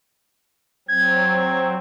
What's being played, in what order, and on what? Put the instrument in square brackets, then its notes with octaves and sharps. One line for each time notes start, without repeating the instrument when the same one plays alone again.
[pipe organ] F#3 C4 [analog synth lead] G#6